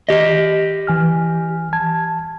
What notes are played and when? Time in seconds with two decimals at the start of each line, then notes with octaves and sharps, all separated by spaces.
0.09 G4 D#5
0.87 E3 G#5 F6
1.73 A5 G#6